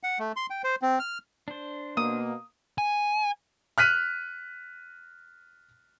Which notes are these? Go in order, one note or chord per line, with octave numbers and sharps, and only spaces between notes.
F#5
A3
C6
G5
C5
C4
F6
D4 C5
B2 A#3 D#6
G#5
F6 F#6 B6 D#7